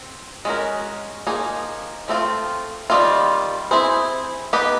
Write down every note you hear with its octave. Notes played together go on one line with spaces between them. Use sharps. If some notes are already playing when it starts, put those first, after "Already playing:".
Already playing: C4
G#3 C#4 F#4 A#4
F3 A#3 D#4 G#4
F3 A3 C4 F4
D#3 G3 C4 F4
C4 E4 G#4 C5
B3 D#4 G4 B4